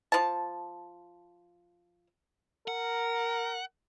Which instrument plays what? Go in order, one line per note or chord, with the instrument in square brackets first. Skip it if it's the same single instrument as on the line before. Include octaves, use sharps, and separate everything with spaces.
[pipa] F3 A5
[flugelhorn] A#4 [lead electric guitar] F#5